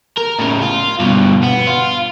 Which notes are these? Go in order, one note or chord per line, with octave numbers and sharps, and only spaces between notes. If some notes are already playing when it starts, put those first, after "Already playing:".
A#4
A2 C#3
F4
G2 B2
B3
F4